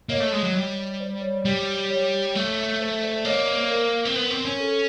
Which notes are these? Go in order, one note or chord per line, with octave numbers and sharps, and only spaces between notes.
A#3 C#5 D#5
A3
G#3
F#3
G3
C5 D5
C#5
G3
C#5
A3
C5
C5 D5
A#3 C#5 D#5
C5 D5
C5
A#4
C4
B3
C4
C#4
A4